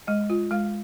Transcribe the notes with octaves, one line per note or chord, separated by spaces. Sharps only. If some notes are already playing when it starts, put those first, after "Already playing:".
G#3 D#5
F4
G#3 F5